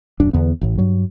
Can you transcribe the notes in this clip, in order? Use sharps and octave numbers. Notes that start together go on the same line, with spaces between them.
D#1 F#2 D4
E2 D3 B3
A1 A2
G2 F#3